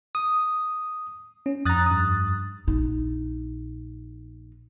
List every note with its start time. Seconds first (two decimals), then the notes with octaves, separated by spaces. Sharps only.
0.15 D#6
1.46 C#4
1.65 F2 A#5 D#6 F#6 A6
1.86 G2 D#6
2.67 A#1 D#4